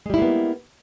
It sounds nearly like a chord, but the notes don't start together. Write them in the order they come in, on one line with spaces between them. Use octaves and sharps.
G#3 G3 E4 A#3 B3